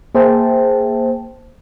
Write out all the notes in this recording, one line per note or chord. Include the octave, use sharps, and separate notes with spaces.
A#3 G#4 C5 E5 G5 A5